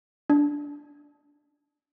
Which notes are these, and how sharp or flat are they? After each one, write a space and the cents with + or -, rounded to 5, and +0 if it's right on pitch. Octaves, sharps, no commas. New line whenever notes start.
D4 -5